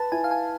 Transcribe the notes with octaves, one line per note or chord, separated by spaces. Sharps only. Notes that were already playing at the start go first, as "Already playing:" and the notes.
Already playing: B4 A5
E4 G#5
F5
G#5